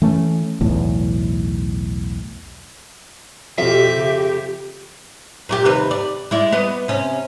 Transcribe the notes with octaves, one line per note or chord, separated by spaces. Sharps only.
E3 A3 C#4
B1 E2 A2
F2 B2 G4 E5
C#3
A#2 F#4 G4
D#2 C3 B4
D5
G#3 E4 D5
B3 D#5
C3 C#4